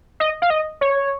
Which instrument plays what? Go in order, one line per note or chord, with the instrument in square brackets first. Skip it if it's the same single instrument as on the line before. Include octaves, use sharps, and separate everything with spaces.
[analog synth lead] D#5
F5
D#5
C#5